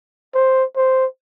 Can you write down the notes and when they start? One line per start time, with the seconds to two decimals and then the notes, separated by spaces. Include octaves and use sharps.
0.34 C5
0.76 C5